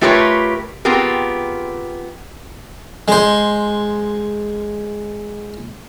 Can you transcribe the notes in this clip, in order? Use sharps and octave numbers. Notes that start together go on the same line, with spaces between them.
A3 F4 G4 A#4 B4 C#5
B3 C4 F4 G4 G#4 A#4
G#3 C5